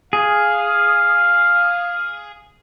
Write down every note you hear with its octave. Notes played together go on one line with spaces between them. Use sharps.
G#4 F5